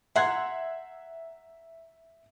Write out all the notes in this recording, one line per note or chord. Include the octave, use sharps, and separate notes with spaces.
E5 F#5 A#5 C6 F#6 G#6